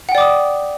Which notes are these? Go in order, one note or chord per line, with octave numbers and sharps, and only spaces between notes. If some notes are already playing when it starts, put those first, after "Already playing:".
D5 F#5 G5 D6 D#6